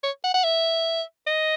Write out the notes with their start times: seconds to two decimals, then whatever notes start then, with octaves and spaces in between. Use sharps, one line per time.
0.03 C#5
0.24 F#5
0.34 F#5
0.44 E5
1.27 D#5